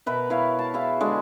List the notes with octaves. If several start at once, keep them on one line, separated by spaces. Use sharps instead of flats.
B2 A#4 B4 E5
E4 C#5 F5
A5
E4 G#4 E5 F5
D3 G#3 D4 F#4